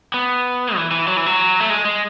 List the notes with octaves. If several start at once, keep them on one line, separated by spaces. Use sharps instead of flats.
B3
E3
E3
F#3
E3
F#3
A3
G#3
G#3